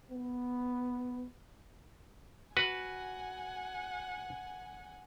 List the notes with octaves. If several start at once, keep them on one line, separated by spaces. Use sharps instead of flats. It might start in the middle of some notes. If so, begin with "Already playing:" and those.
B3
F#4 B4 F#5 G#5